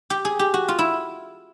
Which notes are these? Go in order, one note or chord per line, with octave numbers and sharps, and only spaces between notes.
G4
G#4
G4
F#4
F4
E4